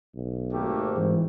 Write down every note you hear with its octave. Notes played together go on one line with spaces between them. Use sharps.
B1
G#1 A3 A#3 G4
G#2 E3